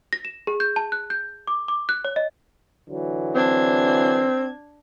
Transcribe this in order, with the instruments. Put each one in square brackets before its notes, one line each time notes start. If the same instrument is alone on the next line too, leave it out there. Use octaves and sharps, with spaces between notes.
[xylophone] A#6
E7
G#4
G6
A5
F#6
G6
D6
D6
F#6
C#5
D#5
[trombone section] D3 E3 F#3
[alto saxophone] C4 [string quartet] D4 G#6